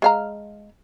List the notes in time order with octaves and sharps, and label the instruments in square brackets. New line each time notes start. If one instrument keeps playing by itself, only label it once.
[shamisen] G#3 F5 A#5